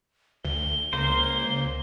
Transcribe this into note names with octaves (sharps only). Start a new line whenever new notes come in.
D2 G7
C#2 A#3 C5